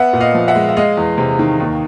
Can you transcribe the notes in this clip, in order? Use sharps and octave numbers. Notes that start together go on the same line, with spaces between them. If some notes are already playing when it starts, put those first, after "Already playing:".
Already playing: B3 E5 F#5
A#2
D#5 F5
F3
E5 F#5
G#3
E5
G#3 D#5 F5
E2
C3
D#3
D#2